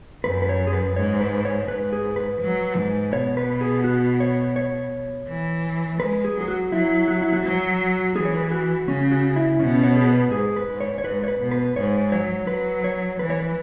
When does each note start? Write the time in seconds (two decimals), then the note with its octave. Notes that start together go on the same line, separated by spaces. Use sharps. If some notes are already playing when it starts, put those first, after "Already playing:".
0.24 F#2 B4
0.42 B4
0.49 C#5
0.67 G#4
0.73 B4
0.96 G#2 C#5
1.21 B4
1.45 C#5
1.68 G#2 B4
1.92 G#4
2.16 B4
2.41 F#3
2.76 G#2
3.12 B2 C#5
3.37 B4
3.61 G#4
3.84 F#4
4.20 C#5
4.56 C#5
5.28 E3
6.00 G#3 B4
6.24 G#4
6.37 F#3 G#4
6.48 F#4
6.72 F#3 E4
7.08 F#4
7.21 E4
7.33 F#4
7.44 F#3
8.16 E3 G#4
8.25 C#5
8.35 B4
8.44 G#4
8.51 F#4
8.88 C#3 C#4
9.11 F#4
9.36 E4
9.59 B2 C#4
9.83 C#5
9.97 G#4
10.09 B4
10.31 G#2 G#4
10.56 B4
10.68 G#2
10.80 C#5
10.98 C#5
11.04 G#2 B4
11.24 C#5
11.28 B4
11.40 B2
11.51 B4
11.76 G#2 C#5
12.12 F#3 C#5
12.47 F#3 B4
12.84 C#5
13.19 E3 B4
13.30 C#5
13.40 B4